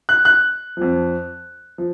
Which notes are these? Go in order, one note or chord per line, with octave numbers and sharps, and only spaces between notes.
F#6
F#6
F2 F3
F3